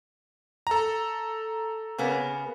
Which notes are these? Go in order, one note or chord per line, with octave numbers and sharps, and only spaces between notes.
A4 A#5
C#3 A#3 B3